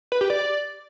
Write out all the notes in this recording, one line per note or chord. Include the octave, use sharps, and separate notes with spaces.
B4
G4
D5